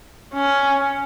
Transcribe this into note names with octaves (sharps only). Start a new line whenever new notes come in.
C#4